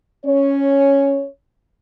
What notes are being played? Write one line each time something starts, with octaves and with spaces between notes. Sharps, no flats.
C#4 C#5